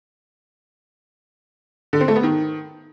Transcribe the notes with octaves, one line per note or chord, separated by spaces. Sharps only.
D3
C4
A3
B3
D#3